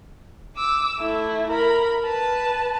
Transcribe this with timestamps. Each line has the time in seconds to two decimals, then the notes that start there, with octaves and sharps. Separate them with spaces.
0.56 D6 E6
1.00 A3 E4
1.50 A#4 B5
2.05 B4 A5